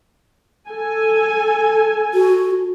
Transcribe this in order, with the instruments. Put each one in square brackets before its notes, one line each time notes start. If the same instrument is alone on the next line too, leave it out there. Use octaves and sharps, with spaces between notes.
[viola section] A4 G#5
[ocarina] F#4